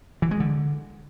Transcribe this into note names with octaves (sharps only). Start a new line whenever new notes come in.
E3
G#3
D3